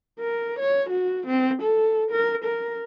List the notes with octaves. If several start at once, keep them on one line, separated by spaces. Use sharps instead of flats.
A#4
C#5
F#4
C4
A4
A#4
A#4